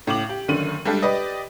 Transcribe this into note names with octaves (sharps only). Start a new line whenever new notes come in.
A2 C#3 D6 F#7
G4
F#1 F#2 D3 D#3 D#7 F#7
G3 G#3 D4 G4 A4
G4 B4 D5 D#5